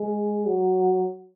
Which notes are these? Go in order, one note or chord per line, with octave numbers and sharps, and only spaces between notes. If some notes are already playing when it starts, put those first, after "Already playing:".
Already playing: G#3
F#3